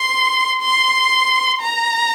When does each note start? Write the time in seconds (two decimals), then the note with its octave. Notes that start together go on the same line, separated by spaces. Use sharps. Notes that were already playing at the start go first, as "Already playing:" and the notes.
Already playing: C6
0.62 C6
1.61 A#5